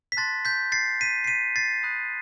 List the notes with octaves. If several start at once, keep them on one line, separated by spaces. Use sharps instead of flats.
B6
A5 C6 F#6 A6
G6 B6
A6 C7
B6 D#7
C7
B6 D#7
A6 C7
B5 D#6 F#6